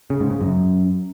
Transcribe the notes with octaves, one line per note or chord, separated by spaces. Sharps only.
C#3
G#2
C#3
F#2